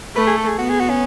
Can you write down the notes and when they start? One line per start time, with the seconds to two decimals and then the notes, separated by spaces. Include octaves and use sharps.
0.15 A3 B4
0.27 G#4
0.37 A4
0.47 G#4
0.58 B3 F#4
0.70 G#4
0.80 F#4
0.90 C#4